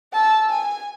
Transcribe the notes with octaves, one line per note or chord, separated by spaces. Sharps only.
A5 E6
G#5